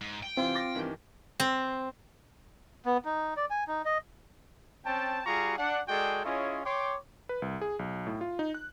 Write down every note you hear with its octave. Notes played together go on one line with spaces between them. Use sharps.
G#2
G5
C3 E3 C4 F4
D6 A6 A#6
G2 D#3 E3
C4
B3
D#4
D5
G#5
D#4
D#5
C4 C#4 G5 A5
G3 F4 F#4 G#4 A#5 C#6
D4 F#5
G#3 F#4 G#4 A4 D5 G5
C#4 E4 F4 G#4 C#5 D#5
C#5 G5 C6 D6
B4
C2
G#4
B1
A2
F4
D#4
F#6